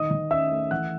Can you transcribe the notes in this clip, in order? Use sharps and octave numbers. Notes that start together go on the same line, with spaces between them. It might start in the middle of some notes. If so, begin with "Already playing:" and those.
Already playing: D#3 D#5 D#6
D#3
C#4 E5 E6
A3
E3 F#5 F#6